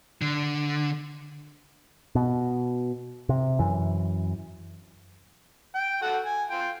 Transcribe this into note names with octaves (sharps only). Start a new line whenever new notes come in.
D3
B2
C3
F#2 E3
G5
F#4 A4 F#5
G#5
F4 G5